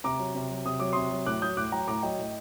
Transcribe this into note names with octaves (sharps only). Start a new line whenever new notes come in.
C3 A#5 D6
F#3
C3
F#3
C3 D#6
F#3 D6
C3 C6 D#6
F#3
A2 D6 F#6
F#3 D#6 G6
A2 D6 F#6
F#3 G5 A#5
A2 A#5 D6
F#3 D#5 G5
A2